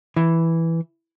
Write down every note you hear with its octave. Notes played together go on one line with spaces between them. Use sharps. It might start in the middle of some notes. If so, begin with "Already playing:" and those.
E3